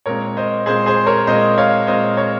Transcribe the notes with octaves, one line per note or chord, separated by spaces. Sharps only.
A#2 G#3 C4 A#4 C#5
C5 D#5
A#2 G#3 C4 G#4 C5
G#4 C5
A#4 C#5
A#2 G#3 C4 C5 D#5
C#5 F5
A#2 G#3 C4 C5 D#5
C#5